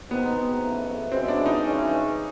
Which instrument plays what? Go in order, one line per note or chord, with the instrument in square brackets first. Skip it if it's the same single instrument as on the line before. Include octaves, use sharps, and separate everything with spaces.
[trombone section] B2 G#3 C4 D#4 [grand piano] B3
[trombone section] F2 C#3 E3 A3
[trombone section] B2 G#3 C#4 E4 [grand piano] C4
[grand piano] D4
D#4
[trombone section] C#3 E3 G#3 C#4